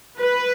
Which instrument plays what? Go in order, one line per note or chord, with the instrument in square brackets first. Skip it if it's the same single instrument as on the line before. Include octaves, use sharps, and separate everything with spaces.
[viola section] B4